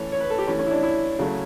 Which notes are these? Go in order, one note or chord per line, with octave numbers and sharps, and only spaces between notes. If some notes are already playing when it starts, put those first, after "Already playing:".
Already playing: E3 A3 C#4 C#5
C#5
B4
A4
G4
E3 A3 C#4
C#4
E4
D4
E4
C#3 F#3 A3 C#4